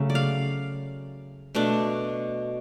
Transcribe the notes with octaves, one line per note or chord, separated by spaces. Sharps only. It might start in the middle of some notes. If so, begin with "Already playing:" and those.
Already playing: C#3 F#3 A3
D5
F5
B2 A3 D4